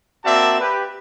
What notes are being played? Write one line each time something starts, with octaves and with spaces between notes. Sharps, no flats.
A#3 C4 F#4 D5 E5 A5
G4 B4